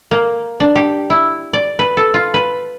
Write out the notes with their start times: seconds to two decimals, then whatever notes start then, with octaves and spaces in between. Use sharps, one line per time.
0.11 A#3
0.60 D4
0.75 G4
1.10 E4
1.53 D5
1.79 B4
1.97 A4
2.14 F4
2.34 B4